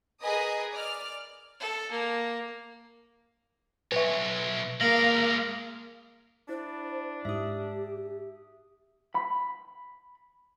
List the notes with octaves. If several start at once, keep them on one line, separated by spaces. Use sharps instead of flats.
G#4 A#4 B4 D#5 G#5 D#6
D5 F6
A4
A#3
B1 B4 C#5 E5
G#3 A#3 A#4 F5 A#6 F#7
D4 E4 C5
G#2 G4 E5 D#6
B5